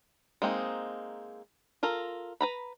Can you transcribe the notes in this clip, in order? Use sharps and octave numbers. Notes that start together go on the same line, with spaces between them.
G#3 A#3 C4 D#4
F4 A4 A#4
B4 A#5 B5